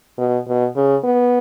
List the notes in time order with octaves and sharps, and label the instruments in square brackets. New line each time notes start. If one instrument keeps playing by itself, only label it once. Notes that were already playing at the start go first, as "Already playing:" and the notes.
[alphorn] B2
B2
C#3
B3